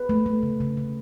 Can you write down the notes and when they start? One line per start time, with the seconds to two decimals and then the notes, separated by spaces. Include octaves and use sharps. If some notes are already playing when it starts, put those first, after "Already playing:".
Already playing: B4
0.09 A3
0.26 A3
0.43 C#3
0.60 C#3
0.77 C#3